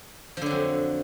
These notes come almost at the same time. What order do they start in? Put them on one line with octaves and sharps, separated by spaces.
F3 D3 F#3 F2